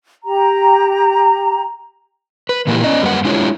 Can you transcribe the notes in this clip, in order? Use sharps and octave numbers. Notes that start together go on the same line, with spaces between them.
G4 A#5
B4
A#2 E3 A#3 D#4 E4 G4
C#4 D5 D#5 A#5
F#2 G3 A3 A#3 B4 F#5
G#3 D4 E4 F4 G4 C#5